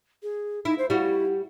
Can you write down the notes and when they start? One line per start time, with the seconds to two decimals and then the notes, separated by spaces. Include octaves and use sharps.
0.23 G#4
0.65 D#4 E4
0.78 C5
0.90 G3 E4 F#4